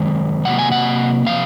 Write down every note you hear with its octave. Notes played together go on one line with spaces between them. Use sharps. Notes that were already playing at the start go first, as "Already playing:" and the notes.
Already playing: F#2 D#3 G#3
C3 F#3 A#3 F#5
G#5
F#5
C3 F3 F5